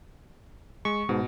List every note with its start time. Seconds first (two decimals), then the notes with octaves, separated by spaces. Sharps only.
0.85 G#3 C#6
1.09 G#2 B2